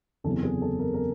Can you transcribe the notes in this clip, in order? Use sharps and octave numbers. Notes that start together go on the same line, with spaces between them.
F#1 E2 C3 A4
G#4
A4
A#4
A#4